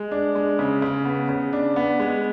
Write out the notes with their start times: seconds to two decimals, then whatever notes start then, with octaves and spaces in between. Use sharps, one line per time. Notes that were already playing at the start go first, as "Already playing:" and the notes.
Already playing: G#3
0.12 D4
0.35 G#3
0.59 C#3
0.82 C#3
1.05 B3
1.29 C#3
1.53 D4
1.76 B3
2.00 G#3